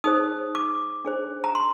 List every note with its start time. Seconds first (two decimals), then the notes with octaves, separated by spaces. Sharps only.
0.04 D#4 G#4 C5 D#6
0.55 D6
1.05 D4 G#4 C5
1.44 A#5
1.55 C6